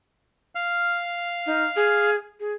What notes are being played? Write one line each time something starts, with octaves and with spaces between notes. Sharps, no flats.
F5 F6
D#4
G#4
G#4